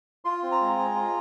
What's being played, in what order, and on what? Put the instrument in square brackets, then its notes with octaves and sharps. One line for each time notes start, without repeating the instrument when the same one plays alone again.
[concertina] F4 C6
C4
A#5
G#3
G#4
F4